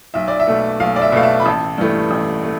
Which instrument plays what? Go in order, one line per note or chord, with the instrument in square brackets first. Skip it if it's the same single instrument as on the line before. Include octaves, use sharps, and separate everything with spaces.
[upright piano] B1 E5
D5
E5
B2 A3
B1 F5
D5
E5
B2 A3 F5
E5
B5
A1 A5
G2 E3 A3
A1
A3